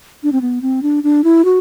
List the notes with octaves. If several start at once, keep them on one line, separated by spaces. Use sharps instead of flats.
D4
C4
B3
C4
D4
D4
E4
F#4